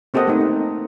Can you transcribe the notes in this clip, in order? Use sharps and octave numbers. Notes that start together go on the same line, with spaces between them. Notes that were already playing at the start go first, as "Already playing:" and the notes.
A#3 C4 G4 A4 D#5 F#5
A3 B3 D#4
D#4